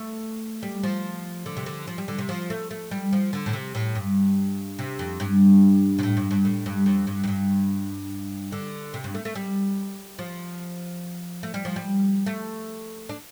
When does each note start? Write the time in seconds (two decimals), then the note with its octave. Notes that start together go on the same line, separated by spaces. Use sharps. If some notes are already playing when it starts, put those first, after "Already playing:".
Already playing: A3
0.63 G3
0.83 F3
1.46 D3
1.57 C3
1.66 D3
1.87 F3
1.98 G3
2.08 D3
2.18 C3
2.29 F3
2.50 A3
2.71 A3
2.91 G3
3.13 F3
3.33 D3
3.46 A2
3.53 C3
3.75 A2
3.95 G2
4.79 C3
4.99 F2
5.20 G2
5.99 C3
6.03 A2
6.17 G2
6.31 G2
6.45 A2
6.66 G2
6.86 F2
7.07 G2
7.24 F2
7.28 G2
8.52 D3
8.94 C3
9.04 G2
9.15 A3
9.25 A3
9.35 G3
10.19 F3
11.43 A3
11.54 G3
11.65 F3
11.76 G3
12.26 A3
13.09 D4